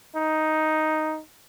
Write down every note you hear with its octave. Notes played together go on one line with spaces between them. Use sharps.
D#4